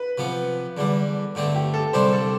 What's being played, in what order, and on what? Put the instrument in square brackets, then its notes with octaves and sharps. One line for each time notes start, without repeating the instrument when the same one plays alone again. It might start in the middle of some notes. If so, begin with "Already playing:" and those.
Already playing: [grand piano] B4
[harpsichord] C3 F3 B3
E2 D3 G3
G2 D3 A3 C4
[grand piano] G4
A4
[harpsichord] C2 C3 G3 D4 [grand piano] C5
[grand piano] A4